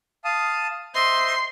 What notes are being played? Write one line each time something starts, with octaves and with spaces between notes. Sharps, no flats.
F5 A5 D#6
C5 D#5 E5 C6